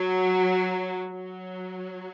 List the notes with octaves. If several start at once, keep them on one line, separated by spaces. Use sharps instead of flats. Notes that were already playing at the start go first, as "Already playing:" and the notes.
Already playing: F#3
F#3